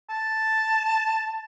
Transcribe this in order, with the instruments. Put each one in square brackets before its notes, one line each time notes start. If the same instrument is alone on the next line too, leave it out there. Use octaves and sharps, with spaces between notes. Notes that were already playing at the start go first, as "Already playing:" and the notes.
[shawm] A5